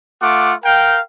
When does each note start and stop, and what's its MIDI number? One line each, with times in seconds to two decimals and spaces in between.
0.22 0.55 57
0.22 0.55 65
0.22 0.55 78
0.22 0.55 86
0.65 1.01 70
0.65 1.01 77
0.65 1.01 79